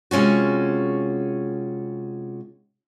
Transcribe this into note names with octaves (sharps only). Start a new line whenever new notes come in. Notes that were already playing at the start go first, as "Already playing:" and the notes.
C3 G#3 C#4 F4 F#4